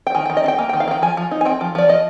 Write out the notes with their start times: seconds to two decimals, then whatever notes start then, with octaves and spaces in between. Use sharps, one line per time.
0.07 G5
0.15 D#3 G#5
0.26 G5
0.30 D#3
0.37 D#5
0.44 D4
0.48 G5
0.58 A#3 G#5
0.69 G5
0.73 D#3
0.80 F5
0.88 D#3 G5
1.02 F3 G#5
1.17 F3
1.31 D#4
1.41 G#5
1.45 C4 G5
1.61 F3
1.75 F3 D5
1.89 F3 D#5